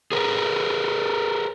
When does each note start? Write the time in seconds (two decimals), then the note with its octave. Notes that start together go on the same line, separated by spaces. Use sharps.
0.12 G#4 A#4 B4